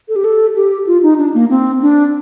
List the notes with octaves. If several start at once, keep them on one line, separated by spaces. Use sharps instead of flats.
A4
G4
A4
G4
F4
D#4
D4
A#3
C4
D4